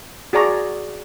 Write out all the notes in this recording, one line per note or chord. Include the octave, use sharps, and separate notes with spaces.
F#4 G#4 D5 A#5 C#6